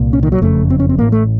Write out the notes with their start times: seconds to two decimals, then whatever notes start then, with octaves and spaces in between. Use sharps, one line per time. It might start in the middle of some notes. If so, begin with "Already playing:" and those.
Already playing: C2 A#2
0.13 C#4
0.23 D#3
0.32 F#3
0.42 F#1 F2 C#3 A3
0.70 C4
0.80 C#4
0.89 C4
0.98 A1 A2 A#3
1.12 A3